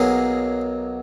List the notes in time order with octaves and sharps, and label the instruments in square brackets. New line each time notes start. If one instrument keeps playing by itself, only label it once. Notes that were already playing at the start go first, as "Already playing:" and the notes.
Already playing: [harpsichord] B1 B2 F#3 A#3 G#4